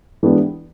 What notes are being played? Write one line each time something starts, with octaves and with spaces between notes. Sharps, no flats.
E3 G#3 B3 D4 G4